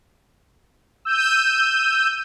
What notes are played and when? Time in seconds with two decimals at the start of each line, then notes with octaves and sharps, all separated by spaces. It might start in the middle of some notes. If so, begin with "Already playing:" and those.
1.05 E6 G6 D#7